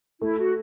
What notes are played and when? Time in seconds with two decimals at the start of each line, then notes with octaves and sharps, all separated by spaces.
0.21 A3 E4
0.39 F#4